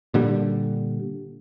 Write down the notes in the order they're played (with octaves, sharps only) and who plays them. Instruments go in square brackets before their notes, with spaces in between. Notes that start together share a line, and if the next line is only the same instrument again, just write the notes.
[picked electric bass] A#2 D3 G3